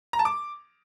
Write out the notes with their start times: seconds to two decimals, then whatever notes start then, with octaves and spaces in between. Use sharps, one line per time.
0.13 A#5
0.19 A5
0.25 D6